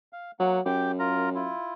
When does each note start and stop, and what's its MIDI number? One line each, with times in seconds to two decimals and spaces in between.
0.13 0.31 77
0.39 0.60 54
0.39 0.61 58
0.39 0.61 78
0.66 1.52 42
0.66 0.92 67
0.66 0.92 79
0.66 0.92 86
0.99 1.29 65
0.99 1.29 70
0.99 1.29 82
1.35 1.74 64
1.35 1.74 65